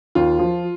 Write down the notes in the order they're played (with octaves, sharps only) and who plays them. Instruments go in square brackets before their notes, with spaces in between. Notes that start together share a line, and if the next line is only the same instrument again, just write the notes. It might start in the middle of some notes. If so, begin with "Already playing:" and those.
[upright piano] D#2 [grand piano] F4
[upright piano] F3